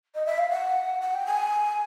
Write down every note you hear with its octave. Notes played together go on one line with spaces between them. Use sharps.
D#5
E5
F5
F#5
F#5
G5
G#5